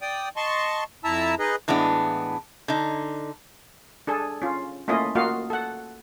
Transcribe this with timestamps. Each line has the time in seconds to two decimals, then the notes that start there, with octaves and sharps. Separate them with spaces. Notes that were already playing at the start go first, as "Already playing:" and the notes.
0.01 D5 G5 D#6
0.36 D#5 A5 C6 C#6
1.04 F2 E4 E5 A5 A#5 E6
1.39 D#4 G#4 B4 D#5
1.68 A2 E3 G#3 B3 D4
2.68 D3 D#4
4.07 D4 G#4 A4
4.42 C#4 F4
4.88 A3 A#3 C#4 E4 F4 D#5
5.15 A#3 F4 F#4 D#5 F5
5.50 A4 F#5